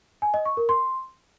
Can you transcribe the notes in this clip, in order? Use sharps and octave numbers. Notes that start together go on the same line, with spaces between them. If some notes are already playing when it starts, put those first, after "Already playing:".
G#5
D#5
C#6
A#4
C6